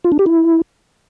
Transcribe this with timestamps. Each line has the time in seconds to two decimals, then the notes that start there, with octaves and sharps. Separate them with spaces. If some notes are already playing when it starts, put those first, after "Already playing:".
0.04 F4
0.12 D4
0.19 G4
0.26 E4